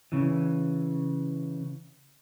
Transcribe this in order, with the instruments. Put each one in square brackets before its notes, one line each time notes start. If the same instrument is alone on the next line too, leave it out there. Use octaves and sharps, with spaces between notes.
[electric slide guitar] C#3 E3